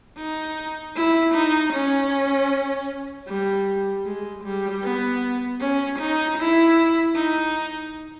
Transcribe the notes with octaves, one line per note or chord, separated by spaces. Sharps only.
D#4
E4
D#4
C#4
G3
G#3
G3
B3
C#4
D#4
E4
D#4